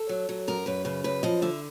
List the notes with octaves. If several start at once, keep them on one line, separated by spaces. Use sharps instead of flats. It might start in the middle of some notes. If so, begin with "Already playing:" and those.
Already playing: A4
F#3
F#3
F#2 A#4
F#2 B4
C#3 B4
F#2 B4
F3 D#5
D3 E5